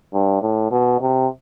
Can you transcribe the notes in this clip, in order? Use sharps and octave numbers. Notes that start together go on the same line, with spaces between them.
G2
A2
B2
C3